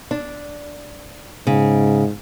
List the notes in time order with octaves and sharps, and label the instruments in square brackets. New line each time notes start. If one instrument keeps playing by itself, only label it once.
[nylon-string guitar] D4
[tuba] G#2 [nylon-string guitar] C#3